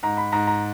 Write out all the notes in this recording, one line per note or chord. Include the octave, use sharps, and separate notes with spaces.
G#2 A#5
B5
G#2 A#5
A#5